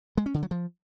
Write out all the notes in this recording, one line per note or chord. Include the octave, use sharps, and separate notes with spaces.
G#3
C#4
D3
F#3
F3